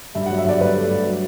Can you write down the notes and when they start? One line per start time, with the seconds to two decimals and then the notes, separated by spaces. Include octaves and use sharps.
0.15 G2 E5
0.26 F#5
0.30 F#3
0.38 E5
0.45 G2 D5
0.61 G2 B4
0.76 A3
0.91 G2
1.06 F#3